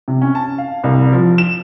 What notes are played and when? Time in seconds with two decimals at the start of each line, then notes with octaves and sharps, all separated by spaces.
0.08 C3
0.21 C#4
0.35 A5
0.58 F5
0.84 C2
1.12 F3
1.38 E7